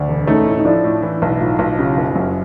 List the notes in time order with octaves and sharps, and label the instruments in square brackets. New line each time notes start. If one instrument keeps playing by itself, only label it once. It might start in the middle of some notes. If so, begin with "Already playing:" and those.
Already playing: [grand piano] D2 [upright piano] D4
[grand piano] E1
[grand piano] A3 [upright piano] C#4 D#4
[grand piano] A2
[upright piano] D#4
[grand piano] F3 [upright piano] D4 E4
[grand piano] A2
E3
B1
[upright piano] E4
[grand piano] A2 [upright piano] D#4 F4
[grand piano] B1
[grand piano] C#3 [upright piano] F4 G4
[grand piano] F#1
F#2